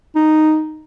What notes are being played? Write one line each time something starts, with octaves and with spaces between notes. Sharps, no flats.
D#4